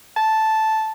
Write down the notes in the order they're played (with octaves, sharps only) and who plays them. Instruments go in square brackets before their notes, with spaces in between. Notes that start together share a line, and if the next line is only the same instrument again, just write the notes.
[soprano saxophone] A5